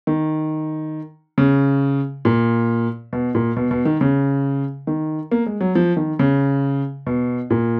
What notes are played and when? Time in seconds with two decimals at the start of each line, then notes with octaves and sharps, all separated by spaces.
0.07 D#3
1.38 C#3
2.25 A#2
3.13 B2
3.35 A#2
3.56 B2
3.71 B2
3.85 D#3
4.01 C#3
4.87 D#3
5.31 A#3
5.46 G#3
5.61 F#3
5.75 F3
5.97 D#3
6.19 C#3
7.07 B2
7.50 A#2